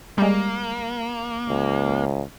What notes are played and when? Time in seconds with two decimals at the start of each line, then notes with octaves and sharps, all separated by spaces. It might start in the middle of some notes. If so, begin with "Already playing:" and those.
0.18 G3 G#3 A#3
1.49 C#2